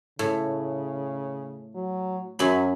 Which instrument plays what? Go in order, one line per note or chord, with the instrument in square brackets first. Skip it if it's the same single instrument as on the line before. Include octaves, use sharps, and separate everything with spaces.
[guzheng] A2 [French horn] C#3
[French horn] F#3
[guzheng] F#2 G#5 B5 [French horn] F#3